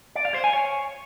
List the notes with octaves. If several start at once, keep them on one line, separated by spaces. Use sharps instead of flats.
D5
F5
C5
G#5
C#5